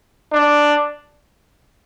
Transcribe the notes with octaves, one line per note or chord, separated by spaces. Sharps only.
D4